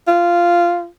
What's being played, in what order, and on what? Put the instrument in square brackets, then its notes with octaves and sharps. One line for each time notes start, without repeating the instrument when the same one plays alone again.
[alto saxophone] F4